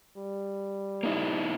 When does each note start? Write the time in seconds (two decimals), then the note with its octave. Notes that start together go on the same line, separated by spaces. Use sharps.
0.17 G3
1.03 A#3 D#4 E4